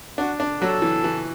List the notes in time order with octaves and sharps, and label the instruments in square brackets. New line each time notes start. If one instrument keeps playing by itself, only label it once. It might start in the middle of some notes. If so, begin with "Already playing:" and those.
[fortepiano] D4 [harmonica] F#4
[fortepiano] D4
[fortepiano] F#3 [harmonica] F#4 A4
[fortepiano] E3
E3